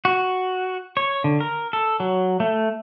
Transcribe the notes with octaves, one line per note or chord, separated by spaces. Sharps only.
F#4
C#5
D3
A#4
A4
F#3
A3